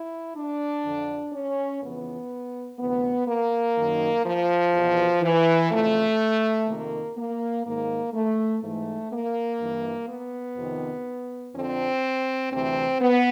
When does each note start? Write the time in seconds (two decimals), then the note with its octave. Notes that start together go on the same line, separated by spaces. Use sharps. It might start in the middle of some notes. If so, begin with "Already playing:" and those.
Already playing: E4
0.36 D4
0.85 F2 D3
1.33 C#4
1.82 F2 C#3 E3 B3
2.79 D2 C3 E3 B3
3.27 A#3
3.76 F#2 D#3
4.24 F3
4.73 E2 B2
5.22 E3
5.71 F2 C#3 E3 A3
6.67 F2 C3 D#3 A#3
7.17 A#3
7.66 G#2 D#3 A#3
8.13 A3
8.62 G#2 E3 A3
9.11 A#3
9.60 G2 E3
10.08 B3
10.57 F2 C3 D#3
11.54 F2 D3 C4
12.52 D2 C3 E3 C4
13.00 B3